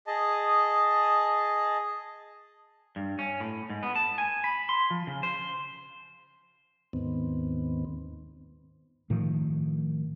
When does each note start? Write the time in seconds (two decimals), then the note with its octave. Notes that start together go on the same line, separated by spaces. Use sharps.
0.07 G#4 D#5 A5
2.96 G2
3.19 C#4
3.40 A2
3.70 G#2
3.83 B3
3.96 A5
4.18 G#5
4.44 B5
4.69 C6
4.91 F3
5.07 C#3
5.23 C5
6.93 D#2 G#2 D#3 B3 C4
9.10 A2 D#3 F3